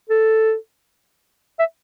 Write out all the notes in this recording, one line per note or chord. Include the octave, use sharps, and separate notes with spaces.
A4
E5